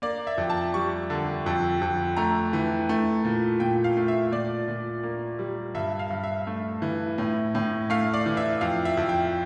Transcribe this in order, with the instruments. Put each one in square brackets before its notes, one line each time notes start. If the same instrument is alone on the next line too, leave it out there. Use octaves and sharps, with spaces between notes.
[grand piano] A#3 D5
E5
F2
A5
G3 C#6
D3
F2
F2
A3 A#5
E3
A3
A#2
A#2 G5
F5
A3
E5
A#2 D5
A#2
A#3
G3
G2 E5
F5
G2
E5
A3
E3
A2
A2
A3 F5
D5
E3
E5
F2 F5
E5
F2
G5